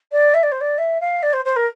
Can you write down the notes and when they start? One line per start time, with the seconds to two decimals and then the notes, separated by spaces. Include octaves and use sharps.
0.12 D5
0.34 E5
0.43 D5
0.52 C5
0.61 D5
0.78 E5
1.01 F5
1.22 D5
1.33 C5
1.45 C5
1.56 A#4